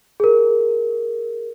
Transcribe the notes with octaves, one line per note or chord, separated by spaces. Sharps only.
G#4 A#4